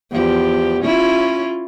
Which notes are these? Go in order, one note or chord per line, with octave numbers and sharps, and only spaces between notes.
E2 F3 G4
C#4 E4 F4